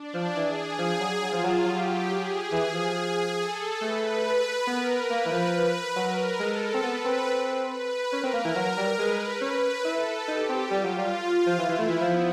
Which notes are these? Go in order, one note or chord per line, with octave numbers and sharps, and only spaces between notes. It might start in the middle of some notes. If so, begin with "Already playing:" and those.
Already playing: D4
F3
E3 G#4
F3
F#3
F#3 F4
F3
F#3
F#3 G4
G#4
E3
F3
A4
A3 B4
B3 A#4
A#3 B4
E3
F3
B4
F#3 A#4
G#3 A4
C4
B3 B4
C4
B4
C#4 A#4
C4
A#3
E3
F#3
G3
G#3 B4
C#4 B4
E4 A4
D#4 G4
C4
G3 F4
F#3
G3
F3
E3 E4
E3
A3
E3
F3 B3